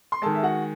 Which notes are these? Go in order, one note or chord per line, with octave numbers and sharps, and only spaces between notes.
C6
D#3 G#3 A4 A5
E5
F#4 F#5